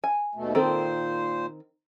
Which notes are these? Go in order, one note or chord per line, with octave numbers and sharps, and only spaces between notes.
G#5
D#2 B2 A3
A#2 D#3 C4 A4 C5